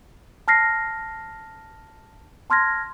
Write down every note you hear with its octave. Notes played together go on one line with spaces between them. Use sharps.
A5 F6 A#6 C7
A5 C6 F6 G#6 A#6